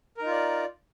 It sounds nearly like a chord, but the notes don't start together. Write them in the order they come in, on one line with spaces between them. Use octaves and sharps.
A#4 D#4 F4 D5